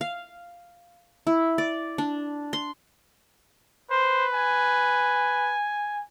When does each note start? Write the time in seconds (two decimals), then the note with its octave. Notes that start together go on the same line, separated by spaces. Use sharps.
0.01 F5
1.27 E4
1.58 D5
1.98 D4
2.53 C6
3.91 B4 C5
4.34 G#5